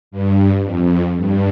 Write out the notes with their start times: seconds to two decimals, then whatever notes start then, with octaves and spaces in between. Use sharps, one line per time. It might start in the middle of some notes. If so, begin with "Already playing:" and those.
0.11 G2
0.64 F2
1.17 G2